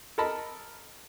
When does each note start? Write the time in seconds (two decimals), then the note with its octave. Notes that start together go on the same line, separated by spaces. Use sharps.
0.18 A4 A#4 D#5 A5 B5